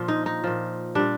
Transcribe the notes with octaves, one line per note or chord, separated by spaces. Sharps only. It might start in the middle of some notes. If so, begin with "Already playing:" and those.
Already playing: A#2 F3 F4
D#4
D#4
A#2 F3
A#2 G3 D4